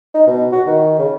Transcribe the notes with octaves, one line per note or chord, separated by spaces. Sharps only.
D#4
B2
F#4
D#3
C#3